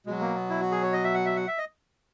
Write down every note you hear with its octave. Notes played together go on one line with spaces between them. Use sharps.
B2 F#3 G#3
A#3
B3
E4
F#4
G#4
C#5
D#5
E5
F#5
E5
F#5
E5
D#5